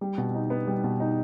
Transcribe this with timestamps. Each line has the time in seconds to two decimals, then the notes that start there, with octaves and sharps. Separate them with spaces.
0.01 G3
0.18 B2
0.34 D#4
0.50 B3
0.67 G3
0.84 B2
1.00 D#4